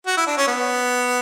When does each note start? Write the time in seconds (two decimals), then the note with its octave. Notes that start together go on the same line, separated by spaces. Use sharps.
0.06 F#4
0.17 E4
0.27 D4
0.37 C#4
0.47 B3